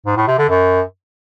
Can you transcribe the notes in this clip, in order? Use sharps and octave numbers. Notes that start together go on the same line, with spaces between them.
G#2
A2
C3
D3
F#2